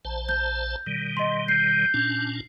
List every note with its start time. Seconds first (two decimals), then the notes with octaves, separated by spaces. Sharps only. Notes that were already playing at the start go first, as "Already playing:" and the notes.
0.05 A#1 C5 A5
0.29 G6
0.86 B2 D#3 G3
1.17 D#5 C6
1.48 G6 C7
1.94 A#2 C#4 D4